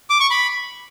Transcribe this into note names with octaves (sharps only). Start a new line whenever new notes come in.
D6
C#6
B5